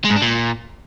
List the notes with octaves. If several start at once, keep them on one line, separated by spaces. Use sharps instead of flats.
G#3
G#2
D4
A#2